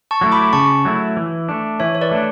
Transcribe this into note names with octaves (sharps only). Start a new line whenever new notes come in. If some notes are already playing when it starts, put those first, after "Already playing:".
A5 C#6
F#3 A3 E4
B5 D6
C#3 A5 C#6
F#3 A3 E4
E3
A3 D4
E3 C#5 E5
C#5
B4 D5
A3 D4